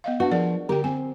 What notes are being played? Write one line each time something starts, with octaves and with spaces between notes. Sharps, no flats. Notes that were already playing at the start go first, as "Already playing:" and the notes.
B3 D#5 F5
D4 F#4 B4
F3 G#4 A#4 D5
D3 G4 A#4 G5
C4 G#5